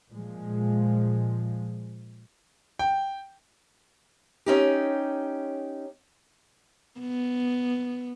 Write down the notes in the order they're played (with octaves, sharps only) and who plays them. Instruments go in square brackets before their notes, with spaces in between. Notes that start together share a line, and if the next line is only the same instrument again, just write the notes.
[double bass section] A#2 F3 G#3
[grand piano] G5
[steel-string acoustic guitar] C#4 D#4 G4
[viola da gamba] B3